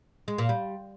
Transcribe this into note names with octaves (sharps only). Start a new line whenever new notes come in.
G#3
A#2
G3